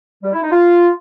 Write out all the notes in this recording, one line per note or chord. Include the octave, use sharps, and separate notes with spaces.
G3
E4
D#4
F4